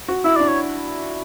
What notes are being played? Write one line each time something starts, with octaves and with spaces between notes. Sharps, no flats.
F#4
E4 E5
D4 D5
C#5